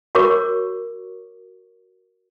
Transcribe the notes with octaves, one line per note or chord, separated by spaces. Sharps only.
F#4 A#4 C#5 C#6 D6